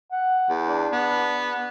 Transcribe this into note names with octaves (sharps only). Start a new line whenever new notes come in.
F#5
E2
D4
B3